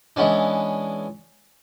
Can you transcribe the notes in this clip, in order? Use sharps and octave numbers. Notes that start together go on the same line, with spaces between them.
E3 G#3 B3 C#4 D4